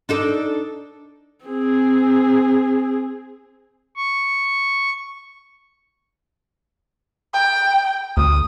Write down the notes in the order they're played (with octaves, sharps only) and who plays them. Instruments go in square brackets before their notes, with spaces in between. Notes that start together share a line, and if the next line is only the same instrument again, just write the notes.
[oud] D4 D#4 A4
[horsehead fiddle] C4 G#4
[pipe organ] C#6
[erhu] G5
[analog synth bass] D2 [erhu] D#6